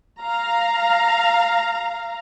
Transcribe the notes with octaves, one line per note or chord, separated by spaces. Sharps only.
F5 A#5